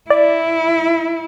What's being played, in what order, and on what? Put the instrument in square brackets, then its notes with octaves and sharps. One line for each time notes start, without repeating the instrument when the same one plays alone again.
[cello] E4 [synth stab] D5